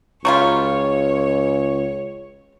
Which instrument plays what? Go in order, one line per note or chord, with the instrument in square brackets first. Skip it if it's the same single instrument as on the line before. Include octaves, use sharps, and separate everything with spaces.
[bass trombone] C#2 [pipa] F#3 G3 F4 [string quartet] C#5 [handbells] C#6